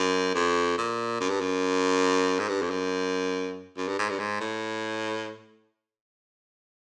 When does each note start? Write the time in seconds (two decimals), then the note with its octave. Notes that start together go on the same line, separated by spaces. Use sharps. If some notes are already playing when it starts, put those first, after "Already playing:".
Already playing: F#2
0.35 F2
0.78 A#2
1.20 F#2
1.30 G2
1.41 F#2
2.39 G#2
2.49 G2
2.62 F2
2.70 F#2
3.77 F#2
3.88 G2
3.99 G#2
4.10 G2
4.19 G#2
4.41 A2